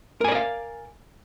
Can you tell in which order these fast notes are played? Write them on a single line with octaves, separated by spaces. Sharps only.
A#4 G#5 D5 D#5 F5